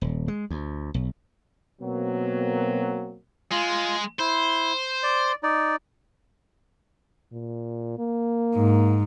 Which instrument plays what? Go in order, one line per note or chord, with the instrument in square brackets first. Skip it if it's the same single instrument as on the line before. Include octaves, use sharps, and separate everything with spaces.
[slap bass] D#1
G#3
D2
B1
[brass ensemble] B2 F#3 A#3 C4
[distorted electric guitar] G#3 [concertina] F4
[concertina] E4 [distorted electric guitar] C5
[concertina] D5
D#4 D5
[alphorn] A#2
A#3
[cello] G#2